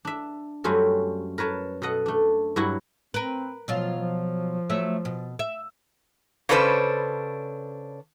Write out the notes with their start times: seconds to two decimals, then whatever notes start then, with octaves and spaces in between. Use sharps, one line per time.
0.05 D4 E5
0.64 F#2 G3 A3 C4 C#4 F#4
1.38 A#4 B4 C#5 A5
1.82 B2 A4 D#5 F#5
2.06 A3 D4
2.56 G2 F#3 E4 F#4 F#5
3.14 C4 A#4 B4
3.68 B2 F3 F#3 F4
3.98 F3
4.70 F#3 A3 E5
5.05 B2
5.39 E5
6.49 C#3 C#4 D4 A4 B4 C5